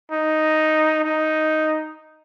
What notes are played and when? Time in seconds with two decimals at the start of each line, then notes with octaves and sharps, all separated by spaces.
0.12 D#4
1.04 D#4